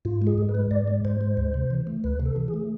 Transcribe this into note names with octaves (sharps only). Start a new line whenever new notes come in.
G#2 F4
G#3
G#4
G#2
B4
G#3
G#2 D5
G#3
G#2 C5
G#3
D2
C3
E3
A3
D2 B4
C3
A4
E3
G#4
A3